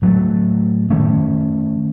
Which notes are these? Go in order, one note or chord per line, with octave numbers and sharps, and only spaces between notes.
A2 F#3 A3
D#3 A3 C#4